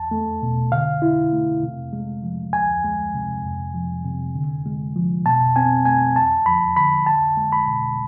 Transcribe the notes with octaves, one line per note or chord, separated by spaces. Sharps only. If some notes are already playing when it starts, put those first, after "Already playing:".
Already playing: E2 A5
A3
B2
D3 F5
E4
A3
C3
G#3
F3
D2 G#5
G#3
C3
F2
F3
C3
D3
G#3
F3
B2 A5
C4 G#5
A3 G#5
E2 A5
F3 B5
D3 B5
C2 A5
G#3
B5
B2